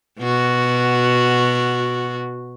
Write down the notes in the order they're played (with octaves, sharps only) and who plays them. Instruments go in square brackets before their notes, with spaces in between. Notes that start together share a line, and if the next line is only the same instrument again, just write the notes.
[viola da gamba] B2 F#4